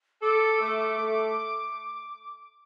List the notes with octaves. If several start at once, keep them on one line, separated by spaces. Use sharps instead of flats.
A4 D6
A3
A3